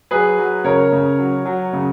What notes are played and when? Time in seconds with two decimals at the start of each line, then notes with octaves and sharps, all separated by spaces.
0.11 F#3 G#4 B4
0.38 F#3
0.64 C#3 A#4 C#5
0.92 C#3
1.19 F#3
1.45 F#3
1.73 C#3